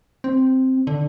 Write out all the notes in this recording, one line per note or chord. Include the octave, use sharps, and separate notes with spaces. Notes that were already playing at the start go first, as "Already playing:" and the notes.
C4
D3